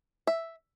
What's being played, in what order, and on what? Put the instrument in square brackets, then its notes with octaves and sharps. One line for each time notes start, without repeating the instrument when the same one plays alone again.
[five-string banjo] E5